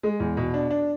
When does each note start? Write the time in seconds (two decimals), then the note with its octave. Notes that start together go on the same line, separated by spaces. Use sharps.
0.03 G#3
0.20 E2
0.37 B2
0.54 D4
0.71 D4